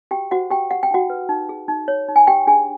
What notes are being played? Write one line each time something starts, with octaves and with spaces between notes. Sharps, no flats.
F#4 G4 G5
F#4 C5 F#5
F#4 G4 G5
G4 F#5
G5
D#4 F#4 F#5
B4
D#4
G#4
D#4
C#5
D#4
G#5
G4 G5
D4 G#4 G#5